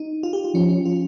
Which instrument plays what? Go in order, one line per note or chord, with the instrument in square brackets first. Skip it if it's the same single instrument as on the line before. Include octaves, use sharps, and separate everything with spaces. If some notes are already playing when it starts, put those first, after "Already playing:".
Already playing: [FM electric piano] D#4
F4
G4
F4
[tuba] F3 [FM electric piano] C#4
[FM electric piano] C#4
F4